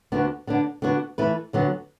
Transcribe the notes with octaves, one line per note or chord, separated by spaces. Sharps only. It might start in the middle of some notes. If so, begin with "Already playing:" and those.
D2 D3 B3 D4 F#4
D3 B3 D4
D3 B3 D4 F#4
E3 A3 E4 B4
D2 D3 F#3 B3